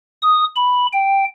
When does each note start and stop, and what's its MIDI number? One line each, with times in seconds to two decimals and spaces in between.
0.22 0.45 87
0.56 0.87 83
0.93 1.25 79